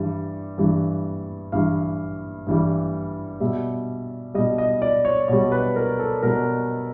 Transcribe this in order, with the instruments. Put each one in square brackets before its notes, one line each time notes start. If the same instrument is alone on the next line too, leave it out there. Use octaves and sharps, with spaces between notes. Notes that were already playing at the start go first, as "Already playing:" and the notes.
Already playing: [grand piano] G2 E3 G3
G2 E3 G3
G2 E3 G3 F5
G2 E3 G3
B2 G3 E5
B2 G3 D#5
D#5
D5
C#5
B2 G3 C#5
B4
A#4
A4
B2 G3 A#4